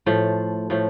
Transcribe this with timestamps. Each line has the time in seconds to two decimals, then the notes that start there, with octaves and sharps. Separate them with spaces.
0.06 A2 F3 A3
0.70 A2 F3 A3